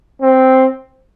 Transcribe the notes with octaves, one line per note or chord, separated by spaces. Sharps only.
C4